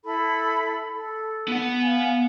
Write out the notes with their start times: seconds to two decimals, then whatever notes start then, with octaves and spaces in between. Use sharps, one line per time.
0.05 E4 A4 B5
0.92 A4
1.48 B3 F#5
1.83 F5 G#5